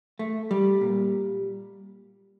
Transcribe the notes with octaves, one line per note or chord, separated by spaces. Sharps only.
A3
G3
A#2